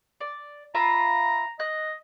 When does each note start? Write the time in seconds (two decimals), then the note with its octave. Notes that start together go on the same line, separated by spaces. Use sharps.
0.21 D5
0.75 F4 E5 A#5 B5
1.60 D#5 F#6